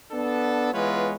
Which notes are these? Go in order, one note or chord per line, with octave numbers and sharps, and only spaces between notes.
B3 D4 A4
E3 G#3 B3 F4 B4 C#5